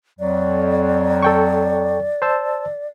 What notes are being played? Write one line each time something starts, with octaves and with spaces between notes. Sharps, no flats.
F2 F#3 D5
A4 G5 C#6
C5 A5 E6